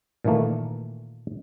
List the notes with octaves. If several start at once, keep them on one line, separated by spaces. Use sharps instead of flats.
A#2 D#3 E3 A3 A#3